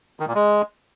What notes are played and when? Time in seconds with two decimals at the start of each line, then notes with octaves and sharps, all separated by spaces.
0.20 D#3
0.27 A#2
0.35 G#3